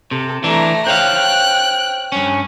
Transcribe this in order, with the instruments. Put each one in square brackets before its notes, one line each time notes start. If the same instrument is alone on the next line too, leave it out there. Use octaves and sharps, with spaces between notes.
[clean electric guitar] C3 [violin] A4
[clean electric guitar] E3 D4 [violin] A3 A#5
[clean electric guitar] C5 C#5 F5 [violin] G5 F#6
[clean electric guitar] G2 C#4